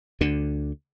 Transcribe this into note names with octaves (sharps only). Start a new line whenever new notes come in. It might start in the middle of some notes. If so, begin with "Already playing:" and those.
D2 D3